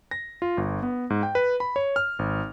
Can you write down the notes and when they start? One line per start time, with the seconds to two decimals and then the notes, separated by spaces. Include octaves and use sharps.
0.11 A#6
0.42 F4
0.57 G1
0.83 B3
1.10 G#2
1.23 G5
1.35 B4
1.60 B5
1.76 C#5
1.96 F6
2.19 G#1